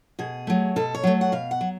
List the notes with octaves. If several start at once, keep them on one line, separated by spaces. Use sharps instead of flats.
B2 G#4
F#3 A3
B2 A4
C#5
F#3 A3
F#5
B2 F5
F#5
F#3